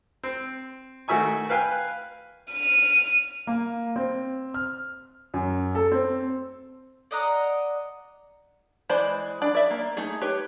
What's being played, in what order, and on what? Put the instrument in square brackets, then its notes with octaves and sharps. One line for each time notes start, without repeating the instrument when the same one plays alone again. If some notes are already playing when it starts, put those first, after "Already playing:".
[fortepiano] C4
D#3 A3 F#4 E5 G#5 C#6
B4 F5 G5 G#5 F#6
[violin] F6 D#7
[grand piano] A#3
C4
F6
F#2
A4
C4
[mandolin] D5 D#5 F#5 A#5
[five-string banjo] E3 G#3 C5 D5 B5
D4 D5 B5
D5 E5
A#3
A3 D#4 G#4
G4 B4 C#5